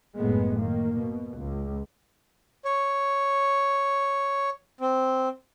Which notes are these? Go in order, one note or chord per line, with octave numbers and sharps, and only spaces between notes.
F#1 A2 G#3 B3
D#3 A#3
B2
C#2
C#5
C4